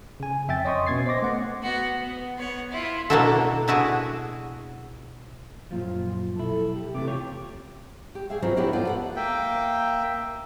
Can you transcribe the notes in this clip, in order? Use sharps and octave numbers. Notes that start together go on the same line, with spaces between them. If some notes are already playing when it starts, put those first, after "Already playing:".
C#3 G#5
F2 E5 G5 A6
C#5 D#5 C6 C#6 D#6
B2 B3 C#4 G#6 A6 C7
C5 D#5 C6 D6 A#6
A3 B3 F#5
B3 F#4
B3
B3 C#5
E4 F4
B2 A#3 D4 E4 F#4 A4
D4 E4 F#4 G#4
F#2 A#2 F3 F4
B1 E4 A4
G4
C3 E3 A3 D6
F4 G4 C#5 G5
G4
G#4 C#5 E5 F5
F3 F#3 B3 C4 D#4
B3 D4 E4 G4 A#4 C#5
F4 F#4 A4 C5 D5
B3 D5 F#5
A#3 E5 G5